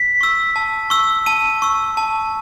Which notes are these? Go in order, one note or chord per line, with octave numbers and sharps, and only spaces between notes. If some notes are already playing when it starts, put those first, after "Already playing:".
Already playing: B6
C#6 E6
A5
C#6 E6
A5 D#7
C#6 E6
A5